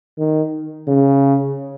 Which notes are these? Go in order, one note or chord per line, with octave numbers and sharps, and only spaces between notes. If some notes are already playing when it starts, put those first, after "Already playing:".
D#3
C#3